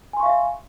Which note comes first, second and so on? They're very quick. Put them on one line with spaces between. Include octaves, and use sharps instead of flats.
G#5 C6 C#6 F5 E5